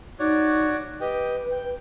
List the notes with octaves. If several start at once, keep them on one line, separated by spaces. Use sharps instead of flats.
D#4 F#4 C#5 D5
G4 B4 D#5 G5
G5